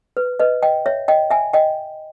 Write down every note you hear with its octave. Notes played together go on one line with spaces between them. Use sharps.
B4
B4 D#5
D#5 G5
C#5 E5
D#5 G5
E5 G#5
D#5 G5